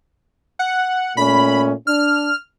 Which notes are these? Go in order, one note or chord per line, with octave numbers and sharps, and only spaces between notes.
F#5
A#2 A3 C#4 B5
D4 F6